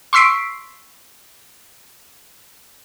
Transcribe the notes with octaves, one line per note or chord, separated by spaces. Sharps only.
C6 C#6 E6 B6 C7 D7